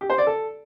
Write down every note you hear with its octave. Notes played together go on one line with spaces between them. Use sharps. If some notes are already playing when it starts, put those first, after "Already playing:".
G4
C5
D5
A4